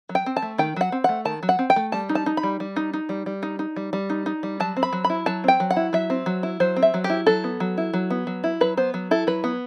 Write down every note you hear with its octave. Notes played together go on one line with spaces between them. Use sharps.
F#3
G5
C4
A5
A3
D#3 G5
F#3 F#5
C4
A3 F#5
D#3 A5
F#3
F#5
C4
G5
A3
G3 A5
D#4
A5
D#4
B5
G3
G3
D#4
D#4
G3
G3
D#4
D#4
G3
G3
D#4
D#4
G3
F#3 A5
C4
B5
F#3
B5
E4
F#3 A5
C4 G5
F#3
F#5
E4
F#3 E5
C4
F#3
E4
F#3 C5
C4
E5
F#3
G4
E4
F#3 A4
B3
F#3
E4
F#3
B3
F#3
E4
F#3 B4
B3 C5
F#3
E4 A4
F#3 B4
B3